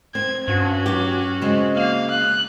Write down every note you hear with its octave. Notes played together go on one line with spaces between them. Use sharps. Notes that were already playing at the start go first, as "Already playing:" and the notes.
C4 G#6
G2 C#4 F#4
F#3 G4
C#3 G#3 C4
A#3 F5
F#6